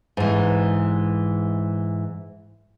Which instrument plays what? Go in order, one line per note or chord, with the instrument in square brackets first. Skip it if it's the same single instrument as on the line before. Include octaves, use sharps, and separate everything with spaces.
[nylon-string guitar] G#2 E3